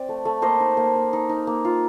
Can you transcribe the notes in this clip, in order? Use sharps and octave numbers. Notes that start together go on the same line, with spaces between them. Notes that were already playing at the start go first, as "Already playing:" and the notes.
Already playing: C4 D5
A3
A3
A#3 C5 D#5
D#4
A#3
A#3
D#4
D#4
A#3
F4